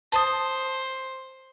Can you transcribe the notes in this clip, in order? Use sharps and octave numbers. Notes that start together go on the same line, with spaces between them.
C5 A5 D#6